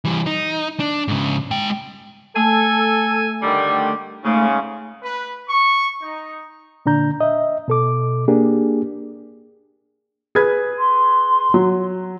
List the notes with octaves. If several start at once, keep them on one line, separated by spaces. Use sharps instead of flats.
E3 G3
D#4
D4
G#2 C#3
G#3 G5
A3 A4 G#5
D3 D#3 G3
G#2 C#3 A3
B4
C#6
D#4
A#2 D3 D4 A#5 G6
D#5 E5
B2 A4 D6
A#3 D4 G4 G#4
G#4 B4 G#6
C6
F#3